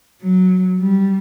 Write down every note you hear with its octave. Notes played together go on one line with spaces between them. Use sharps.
F#3
G3